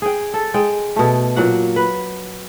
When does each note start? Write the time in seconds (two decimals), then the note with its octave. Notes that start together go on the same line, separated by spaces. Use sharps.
0.02 G#4 G5
0.34 A4
0.54 G#3 G5
0.96 B2 A3
1.36 A#2 F#3 F#5
1.76 B4